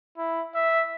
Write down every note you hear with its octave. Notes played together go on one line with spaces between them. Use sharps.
E4
E5